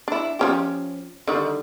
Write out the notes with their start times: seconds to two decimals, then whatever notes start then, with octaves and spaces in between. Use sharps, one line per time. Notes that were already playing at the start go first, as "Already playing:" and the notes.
0.08 D4 E4
0.39 F3 C#4 G4
1.27 D3 D#3 G3